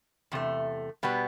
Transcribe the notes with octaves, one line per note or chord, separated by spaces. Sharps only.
E2 C3 A3
B2 G3 B3